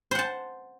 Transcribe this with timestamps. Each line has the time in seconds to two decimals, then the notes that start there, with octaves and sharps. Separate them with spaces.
0.11 C5
0.15 F#5
0.19 A5